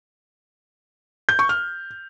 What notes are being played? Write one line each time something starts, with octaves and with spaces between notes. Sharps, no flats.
G6
C#6
F6